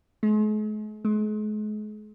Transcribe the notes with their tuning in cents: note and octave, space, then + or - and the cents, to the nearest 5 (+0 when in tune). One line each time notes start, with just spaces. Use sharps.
G#3 +45
G#3 +40